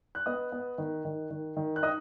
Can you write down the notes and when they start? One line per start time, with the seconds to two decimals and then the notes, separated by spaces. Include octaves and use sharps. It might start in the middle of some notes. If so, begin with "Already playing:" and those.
0.15 F#6
0.26 B3 D#5 D#6
0.52 B3
0.78 D#3
1.05 D#3
1.31 D#3
1.57 D#3
1.76 F#6
1.83 D#4 D#5 D#6